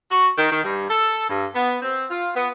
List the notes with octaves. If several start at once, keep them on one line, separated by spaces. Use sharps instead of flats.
F#4
D#3
D#3
G2
A4
G2
B3
C4
F4
B3